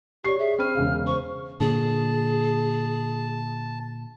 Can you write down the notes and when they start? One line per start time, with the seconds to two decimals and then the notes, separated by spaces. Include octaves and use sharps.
0.24 G4 C#5 D5 C#6 C7
0.39 G#4 E5
0.59 C4 B5 F6 D#7
0.75 E1 C#3 F5
1.07 C5 C#6
1.60 A#2 D3 G#4 A5